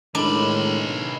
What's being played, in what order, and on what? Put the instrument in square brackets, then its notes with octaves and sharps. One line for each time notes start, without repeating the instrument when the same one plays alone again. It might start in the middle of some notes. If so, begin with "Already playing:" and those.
[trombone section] A2 D#3 G#3 [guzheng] D4 [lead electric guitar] D#4 B4